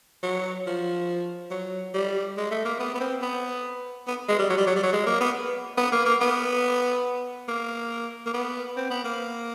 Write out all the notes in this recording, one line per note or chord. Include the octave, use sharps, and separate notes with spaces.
F#3
F3
F#3
G3
G#3
A3
A#3
B3
B3
C4
B3
B3
G#3
G3
F#3
G3
F#3
G3
F#3
G#3
A#3
B3
B3
A#3
A#3
B3
A#3
A#3
B3
C4
B3
A#3